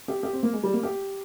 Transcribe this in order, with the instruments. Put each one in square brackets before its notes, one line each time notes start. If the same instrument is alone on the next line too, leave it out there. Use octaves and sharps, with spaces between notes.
[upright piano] G4
G4
C4
A#3
G#3
G3
A#3
G4